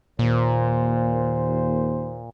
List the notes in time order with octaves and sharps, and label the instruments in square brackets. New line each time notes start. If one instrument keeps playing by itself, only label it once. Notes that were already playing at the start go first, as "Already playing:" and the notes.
[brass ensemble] D#2 C5 [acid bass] A#2